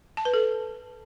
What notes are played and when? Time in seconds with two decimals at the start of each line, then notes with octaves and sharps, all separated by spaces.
0.17 A5
0.25 B4
0.34 A4